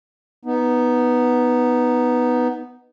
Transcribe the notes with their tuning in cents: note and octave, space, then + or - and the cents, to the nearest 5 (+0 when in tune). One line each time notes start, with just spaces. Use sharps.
B3 +0 D#4 +0